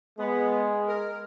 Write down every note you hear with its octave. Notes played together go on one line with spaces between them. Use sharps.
G#3 B3
A#4